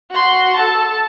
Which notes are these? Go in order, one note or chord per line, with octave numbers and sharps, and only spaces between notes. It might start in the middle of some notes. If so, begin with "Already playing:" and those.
F#4 C6
A4 A5